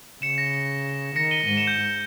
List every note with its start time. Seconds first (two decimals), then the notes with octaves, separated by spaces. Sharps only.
0.22 C#3 C#7 E7
0.38 A#6
1.16 D#3 A#6 C#7
1.31 D#7 G7
1.47 G#2 D#7 G7
1.57 C#7 E7
1.67 G6